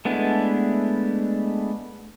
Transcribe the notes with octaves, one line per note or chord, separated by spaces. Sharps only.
G#3 A3 B3 D4 E4